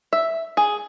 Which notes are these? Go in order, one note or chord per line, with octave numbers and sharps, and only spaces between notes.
E5
G#4